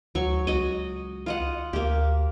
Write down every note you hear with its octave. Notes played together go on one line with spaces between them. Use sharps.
D2 F#3 C#6
C#2 F#4 D#5
F4 D#5 F#5
D2 A#3 G4